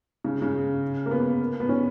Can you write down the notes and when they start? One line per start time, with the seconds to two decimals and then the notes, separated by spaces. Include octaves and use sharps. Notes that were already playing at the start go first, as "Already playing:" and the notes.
0.24 C#3
0.42 C#3
1.06 A#3
1.11 B3
1.60 B3
1.69 C#4